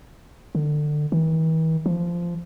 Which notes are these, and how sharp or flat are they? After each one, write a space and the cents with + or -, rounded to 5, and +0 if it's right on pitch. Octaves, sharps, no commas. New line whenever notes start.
D3 +25
E3 -45
F3 -15